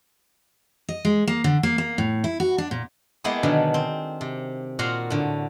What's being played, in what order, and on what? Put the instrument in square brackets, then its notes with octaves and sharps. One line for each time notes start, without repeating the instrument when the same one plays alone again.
[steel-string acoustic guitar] D#5
G#3
A#3
D3
A#3
A#3
A2
E4
F#4
D4
A#2
[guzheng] G#3 A#3 B3 E4 G4 G#4
B2 D3 D#3 F#3 D4
C4
C3
A#2 F#4 F5 F#5 A#5 C6
A2 D3